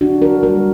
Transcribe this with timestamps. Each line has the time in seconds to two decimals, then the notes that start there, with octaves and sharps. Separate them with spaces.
0.01 D3 D4 F#4
0.22 F#4 A#4
0.43 G3 A#3 F#4 A#4